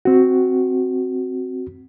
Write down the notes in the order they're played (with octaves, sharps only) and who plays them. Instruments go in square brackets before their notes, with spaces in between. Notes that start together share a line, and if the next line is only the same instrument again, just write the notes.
[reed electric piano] C4 F#4